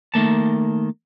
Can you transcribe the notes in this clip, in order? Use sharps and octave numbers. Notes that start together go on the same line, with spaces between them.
D#3 A3 A#3 A5